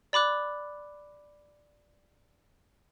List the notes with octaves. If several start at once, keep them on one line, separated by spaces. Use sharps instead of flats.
D5 B5 D6 F#6